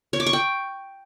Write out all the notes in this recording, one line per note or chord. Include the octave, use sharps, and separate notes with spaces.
C#5
D6
C#6
G5